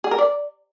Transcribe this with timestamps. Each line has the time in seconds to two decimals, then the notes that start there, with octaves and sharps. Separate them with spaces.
0.04 G#4
0.11 A#4
0.19 D5